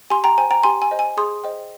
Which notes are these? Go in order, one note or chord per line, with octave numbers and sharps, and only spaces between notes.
G4 G#5 C6
G5 A#5
C5 G5 G#5
G5 A#5
G4 G#5 C6
G#5
C5 D#5
G#5
G#4 C6 D#6
C5 D#5 G5